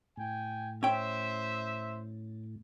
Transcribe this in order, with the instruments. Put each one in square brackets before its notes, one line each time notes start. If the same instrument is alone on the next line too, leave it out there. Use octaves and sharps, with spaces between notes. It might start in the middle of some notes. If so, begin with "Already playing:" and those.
[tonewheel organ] A2 [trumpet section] G5 G#5
[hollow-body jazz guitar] C#4 G5 [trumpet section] C5 E5